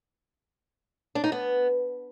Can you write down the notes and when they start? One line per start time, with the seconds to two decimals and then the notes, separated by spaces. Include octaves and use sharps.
1.15 D4
1.24 D#4
1.32 B3